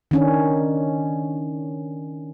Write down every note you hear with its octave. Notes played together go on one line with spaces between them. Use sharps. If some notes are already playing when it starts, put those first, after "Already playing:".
D#3 C#4 D4